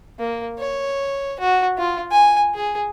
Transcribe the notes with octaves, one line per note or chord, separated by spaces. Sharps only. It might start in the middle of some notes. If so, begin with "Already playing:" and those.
A#3
C#5
F#4
F4
G#5
G#4